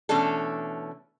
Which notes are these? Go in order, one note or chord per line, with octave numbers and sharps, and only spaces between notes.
B2 E3 A3 C#4 D4 A4